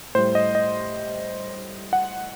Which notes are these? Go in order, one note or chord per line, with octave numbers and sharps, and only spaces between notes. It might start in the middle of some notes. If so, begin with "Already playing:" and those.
A2 G3 C5
D#5
D#5
F#5